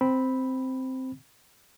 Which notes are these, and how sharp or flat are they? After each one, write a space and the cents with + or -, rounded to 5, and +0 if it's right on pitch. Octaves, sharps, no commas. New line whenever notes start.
C4 -5 B5 +0